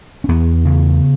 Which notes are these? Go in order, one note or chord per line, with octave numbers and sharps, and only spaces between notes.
C#4
E2 B3
C#3